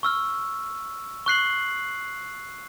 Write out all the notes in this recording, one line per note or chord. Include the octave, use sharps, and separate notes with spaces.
C#6 E6 F6
C#6 F#6 C7 F#7